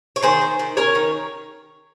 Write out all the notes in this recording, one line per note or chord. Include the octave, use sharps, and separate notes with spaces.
C#5
D#3 G#4 C5
D#3
D#3
C#4 A#4 C#5
D#3